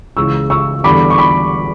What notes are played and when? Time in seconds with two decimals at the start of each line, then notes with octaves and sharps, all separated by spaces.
0.17 C#2 C#3 E3 C#6 E6
0.50 C#6 E6
0.84 E2 D3 G3 B5 D6
1.10 C#6
1.18 B5 D6